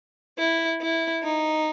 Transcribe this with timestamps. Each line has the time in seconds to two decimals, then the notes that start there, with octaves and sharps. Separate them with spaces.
0.39 E4
0.81 E4
1.24 D#4